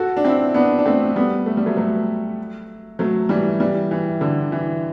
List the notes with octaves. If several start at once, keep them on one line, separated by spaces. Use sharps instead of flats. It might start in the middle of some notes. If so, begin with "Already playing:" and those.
Already playing: F#4 A4
D4
C4 E4
B3 D4
D4
A3 C4
G3 B3
A3
G3
F#3 A3
F#3 A3
F#3 A3
E3 G3
E3 G3
E3
D3
E3